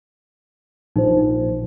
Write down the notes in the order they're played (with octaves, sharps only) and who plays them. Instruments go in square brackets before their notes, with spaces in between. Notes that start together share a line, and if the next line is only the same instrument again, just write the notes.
[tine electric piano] A#1 [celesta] D#4 C5